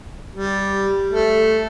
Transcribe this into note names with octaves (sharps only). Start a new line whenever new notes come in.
G3
A3